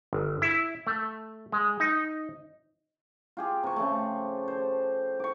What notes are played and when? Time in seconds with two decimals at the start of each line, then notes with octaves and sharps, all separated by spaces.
0.13 G1
0.42 E4
0.87 A3
1.52 G#3
1.80 D#4
3.37 F4 G4 G#4
3.63 C3 C#6
3.76 C#3 F3 A3
4.48 C5
5.20 C#6 D6